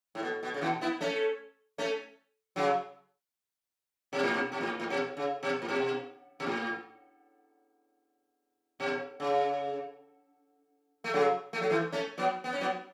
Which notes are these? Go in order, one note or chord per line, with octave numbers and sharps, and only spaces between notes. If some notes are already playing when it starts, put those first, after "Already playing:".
A2
B2
B2
C#3
B2 E3
B3 E4
A3 C#4
A3 C#4
C#3 F#3
B2
A2
B2
B2
A2
A2
B2
C#3
B2
A2
B2
B2
A2
B2
C#3
A3
C#3 F#3
A3
F#3
E3 A3
A3 C#4
F#3 B3
B3
C#4
F#3 B3